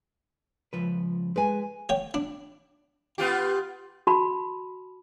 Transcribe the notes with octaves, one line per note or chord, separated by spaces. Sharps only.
C#2 F3 B4
G#3 B4 G#5
C#5 G5
D4
B3 F4 G4
F#4 A5 B5